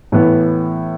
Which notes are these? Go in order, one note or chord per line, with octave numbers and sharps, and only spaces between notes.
A2 E3 B3